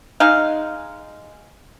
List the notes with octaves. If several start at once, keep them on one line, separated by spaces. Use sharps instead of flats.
G#3 D#4 F5